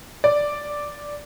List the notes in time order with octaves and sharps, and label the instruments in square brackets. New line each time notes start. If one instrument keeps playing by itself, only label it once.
[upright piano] D5